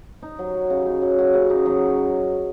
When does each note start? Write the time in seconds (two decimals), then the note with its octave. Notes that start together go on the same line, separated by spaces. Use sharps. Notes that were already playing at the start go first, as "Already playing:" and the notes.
0.22 D#4
0.39 F#3
0.54 F#4
0.70 C#3
0.86 D#4
1.02 F#3
1.19 F#4
1.34 C#3
1.50 D#4
1.66 F#3